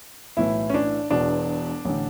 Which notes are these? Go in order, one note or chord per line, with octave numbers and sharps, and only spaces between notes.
B1 A2 E3 E4
C#4
D4
E1 E2 B2 D4
A1 D3